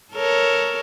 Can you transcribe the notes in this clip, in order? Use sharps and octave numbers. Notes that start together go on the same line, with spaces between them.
A4 A#4 C#5